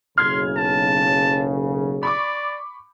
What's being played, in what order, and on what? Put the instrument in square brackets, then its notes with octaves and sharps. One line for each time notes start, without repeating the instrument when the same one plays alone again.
[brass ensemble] F#1 B1 C#3 [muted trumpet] C6 [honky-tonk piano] F6 G#6
[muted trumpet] A5
[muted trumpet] D5 [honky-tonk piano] B5 C#6 D6